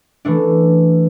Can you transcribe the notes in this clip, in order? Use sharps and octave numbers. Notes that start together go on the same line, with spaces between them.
E3 A3 D4